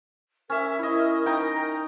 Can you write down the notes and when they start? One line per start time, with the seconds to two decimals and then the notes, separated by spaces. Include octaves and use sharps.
0.50 C#4 A#4 E5
0.79 E4 D#5
1.26 D#4 G5 A#5